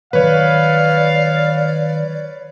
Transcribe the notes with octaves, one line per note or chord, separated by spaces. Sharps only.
D#3 F#3 G3 B4 C#5 D5 F5